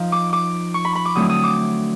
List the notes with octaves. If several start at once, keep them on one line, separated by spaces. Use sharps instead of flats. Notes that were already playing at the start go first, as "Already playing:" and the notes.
Already playing: F3 D#4
D6
D6
C#6
B5
B5
D6
D3 F#3 A3 C4 E4 D#6
D#6
D6